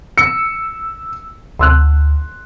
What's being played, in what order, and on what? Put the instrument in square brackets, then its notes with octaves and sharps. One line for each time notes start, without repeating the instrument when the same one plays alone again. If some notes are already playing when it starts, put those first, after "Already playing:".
[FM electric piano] E6 [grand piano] C#7
[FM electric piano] D2 [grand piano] C6 E6 F#6